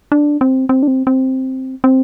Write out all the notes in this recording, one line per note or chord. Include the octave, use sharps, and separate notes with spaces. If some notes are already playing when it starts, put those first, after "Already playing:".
D4
C4
C4
D4
C4
C4
C4